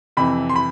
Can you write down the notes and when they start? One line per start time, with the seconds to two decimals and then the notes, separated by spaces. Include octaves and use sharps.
0.17 F2 C3 E3 B5
0.49 C6
0.56 B5